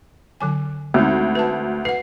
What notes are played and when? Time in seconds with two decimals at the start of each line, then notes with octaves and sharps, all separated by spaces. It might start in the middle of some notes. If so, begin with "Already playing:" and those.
0.41 D3 F#3 G#5
0.94 D2 G#3 C4 D#4
1.35 B4 A5
1.85 B4 F#5 C7